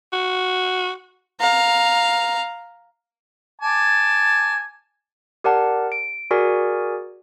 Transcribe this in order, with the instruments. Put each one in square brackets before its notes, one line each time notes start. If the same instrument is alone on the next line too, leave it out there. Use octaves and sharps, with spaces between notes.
[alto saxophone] F#4
[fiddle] F5 A#5
[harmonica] G#5 A5 D6
[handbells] G4 A#4 D5 F#5 A5
D7
F#4 G#4 A#4 D5 G#5